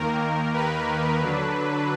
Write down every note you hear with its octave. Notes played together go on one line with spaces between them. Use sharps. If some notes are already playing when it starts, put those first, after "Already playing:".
Already playing: D#2 D#3 A#3 A#4
B4
D3 F#3 D4